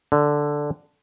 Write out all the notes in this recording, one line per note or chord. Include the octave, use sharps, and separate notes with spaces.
D3